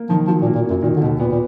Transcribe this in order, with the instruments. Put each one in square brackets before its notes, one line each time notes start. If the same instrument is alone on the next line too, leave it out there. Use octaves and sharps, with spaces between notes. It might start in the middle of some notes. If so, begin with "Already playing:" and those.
Already playing: [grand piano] A#3
[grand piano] D#3 [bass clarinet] F3
[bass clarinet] F3 [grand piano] F#3
[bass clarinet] A#2
[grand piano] A#3
[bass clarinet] A#2
[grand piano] F#3
[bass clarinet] F#2
[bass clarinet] A#2 [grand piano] D#3
[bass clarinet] D3
[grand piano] D#2 [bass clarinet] B2
[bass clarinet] A#2 [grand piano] B3
[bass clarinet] A#2